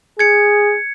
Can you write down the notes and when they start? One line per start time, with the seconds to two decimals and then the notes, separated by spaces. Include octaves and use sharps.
0.19 G#4 G#6 C#7